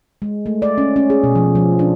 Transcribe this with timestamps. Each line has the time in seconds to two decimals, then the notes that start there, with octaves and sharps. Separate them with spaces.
0.22 G#3
0.46 A3
0.62 D5
0.78 C#4
0.96 C#4
1.10 G#4
1.24 B2
1.35 F3
1.55 F3
1.79 D4